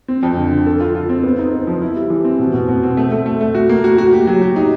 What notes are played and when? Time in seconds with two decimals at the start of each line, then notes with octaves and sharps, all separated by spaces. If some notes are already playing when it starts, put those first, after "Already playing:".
0.08 C4
0.23 F2
0.37 D3
0.52 D3
0.66 A4
0.80 F4
0.95 F4
1.09 C4
1.24 B3
1.39 D#4
1.53 B3
1.67 F3
1.82 E4
1.96 G3
2.10 E3
2.25 C4
2.39 B2
2.53 B2
2.68 B2
2.83 C4
2.97 A3
3.12 A3
3.26 A3
3.41 A3
3.55 F#4
3.69 A#3
3.84 F#4
3.98 F#4
4.12 G4
4.27 F#3
4.41 G4
4.56 D#4